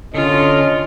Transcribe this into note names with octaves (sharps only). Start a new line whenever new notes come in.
D3 C#4 F4 D#5